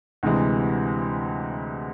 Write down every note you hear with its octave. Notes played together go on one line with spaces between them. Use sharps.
D2 C3 E3 G#3